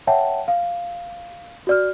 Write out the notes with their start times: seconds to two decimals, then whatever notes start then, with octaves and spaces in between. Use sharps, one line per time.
0.07 C#5 E5 F#5 G5 A5
0.48 F5
1.67 F#4 D5 F6